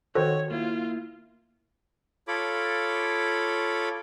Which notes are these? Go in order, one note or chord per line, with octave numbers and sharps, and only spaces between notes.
D#3 F#4 A4 C5 C#5 G5
A#3 E4 F4
F4 A4 C#5 B5 D6